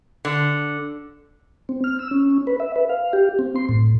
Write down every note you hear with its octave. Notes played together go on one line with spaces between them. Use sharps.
D3
C4
F6
E6
C#4
B4
E5
B4
F5
G4
C4
C6
A2